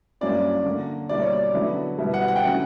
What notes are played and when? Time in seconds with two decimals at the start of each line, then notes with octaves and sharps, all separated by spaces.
0.21 G2 F#3 A#3 C#4 E4 D5
0.65 D3 A#3 D4
1.09 B2 G3 A#3 E4 D5
1.22 C#5
1.33 D5
1.54 D3 F#3 B3 E4
1.98 B2 G3 B3 E4
2.14 F#5
2.28 F#5
2.36 G5
2.43 D3 F#3 C#4 E4 F#5